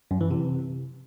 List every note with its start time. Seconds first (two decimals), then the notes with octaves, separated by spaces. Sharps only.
0.11 F#2
0.21 E3
0.31 C3